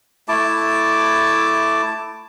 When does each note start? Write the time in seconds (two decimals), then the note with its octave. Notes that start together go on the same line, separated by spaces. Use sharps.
0.28 A3 E4 A5 D6